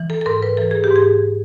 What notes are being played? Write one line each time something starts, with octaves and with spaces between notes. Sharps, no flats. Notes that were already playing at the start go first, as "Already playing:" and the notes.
Already playing: E3
A4
A4
G#2 A#4
B4
E3 A4
G#4
G4
G#2
G#4